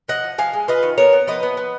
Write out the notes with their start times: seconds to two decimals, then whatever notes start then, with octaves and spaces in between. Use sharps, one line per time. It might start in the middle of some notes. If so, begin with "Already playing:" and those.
0.08 F3 D#5 F#5
0.24 F3
0.38 F3 F5 G#5
0.53 G#3
0.68 F4 B4 D#5
0.83 D#3
0.98 B3 A#4 C#5
1.13 B3
1.27 F3 B4 D#5
1.43 B3
1.57 B3